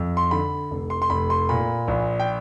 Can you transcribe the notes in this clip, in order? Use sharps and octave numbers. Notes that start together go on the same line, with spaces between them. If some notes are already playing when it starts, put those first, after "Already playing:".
Already playing: F2
C6
D3 B5
F1
C6
C6
F1 B5
C6
A#2 B5
A#1
G5